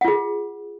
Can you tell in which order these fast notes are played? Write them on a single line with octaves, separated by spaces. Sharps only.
F#5 F4 G#4